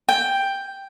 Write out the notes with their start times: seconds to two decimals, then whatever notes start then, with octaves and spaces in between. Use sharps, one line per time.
0.09 G5